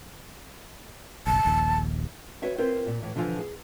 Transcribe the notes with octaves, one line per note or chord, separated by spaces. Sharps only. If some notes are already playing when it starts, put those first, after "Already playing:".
F#1 B1 A5
D#1 A#1 D#2
F#4 B4 C#5 E5 G5
C4 E4 F4 A#4 C5
A#2
A2 E3
B2 D3 E3 F3 F4 G#5
G#4